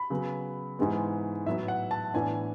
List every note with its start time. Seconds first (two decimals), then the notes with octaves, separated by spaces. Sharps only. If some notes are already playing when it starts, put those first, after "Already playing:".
Already playing: B5
0.10 C#3 F#3 B3
0.79 G#2 E3 G#3 B3
1.46 A2 F#3 B3 E4 E5
1.68 F#5
1.91 A5
2.14 A2 E3 B3 D4 G#5